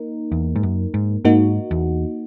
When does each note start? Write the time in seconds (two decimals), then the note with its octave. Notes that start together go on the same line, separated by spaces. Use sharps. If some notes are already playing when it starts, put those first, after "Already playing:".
Already playing: A#3 D#4 A#4
0.32 E2
0.56 G#2
0.63 F#2
0.94 G#2
1.24 G#2 A#3 D#4 F#4
1.71 E2